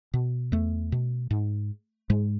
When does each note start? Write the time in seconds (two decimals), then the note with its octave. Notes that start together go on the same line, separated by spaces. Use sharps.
0.14 B2
0.52 E2 A3
0.92 B2
1.31 G#2
2.10 G#2 G#3